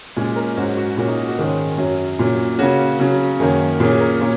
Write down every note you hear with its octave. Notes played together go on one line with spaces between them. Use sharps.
A#2 G#3 C#4 C#5
A#4
G#2 F#3 C#4 F#4
F#4
A#2 A#3 C#4 F#4
D#4
F#4
F#4
G#2 D#3 G#3 C#4
F#2 F#3 C#4
A#2 F#3 C#4
C#3 A#3 C#4 F#4
C#3 F#3 C#4
F#2 D#3 A#3 C#4
A#2 A#3 C#4 G#4
A#4
A#2 A#3 C#4 C#5